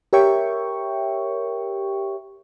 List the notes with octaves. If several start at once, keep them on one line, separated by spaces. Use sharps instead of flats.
G4 A#4 C#5 E5 G5 C#6